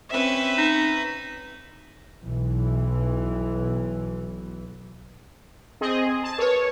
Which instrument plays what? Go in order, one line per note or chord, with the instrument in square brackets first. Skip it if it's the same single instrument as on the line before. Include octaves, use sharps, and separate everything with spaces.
[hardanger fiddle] C4 C#4 [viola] B4 E5
[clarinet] D#4
[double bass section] B1 E3
[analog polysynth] C4 G#4 D#5
A5
[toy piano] A#4 B4 [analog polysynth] C#5